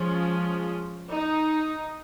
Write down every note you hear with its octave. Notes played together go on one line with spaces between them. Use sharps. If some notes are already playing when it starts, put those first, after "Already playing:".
Already playing: F3 G#3 C#4
D#4